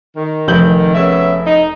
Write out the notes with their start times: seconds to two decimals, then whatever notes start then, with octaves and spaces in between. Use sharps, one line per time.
0.16 D#3
0.48 F1 G6 F#7
0.95 C#3 B3 E5
1.47 D#4